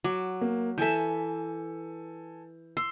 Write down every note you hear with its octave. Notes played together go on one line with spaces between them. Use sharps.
F#3 D6
A#3
E3 A4 E5 G#5 G6
C6 E6